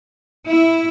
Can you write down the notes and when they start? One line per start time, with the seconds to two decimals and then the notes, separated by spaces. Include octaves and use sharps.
0.46 E4